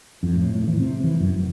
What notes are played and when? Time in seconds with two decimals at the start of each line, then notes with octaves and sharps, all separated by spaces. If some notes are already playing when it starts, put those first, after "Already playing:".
0.23 F2
0.36 A2
0.55 A2
0.67 E3
0.80 C3
1.04 E3
1.20 F#2
1.33 F1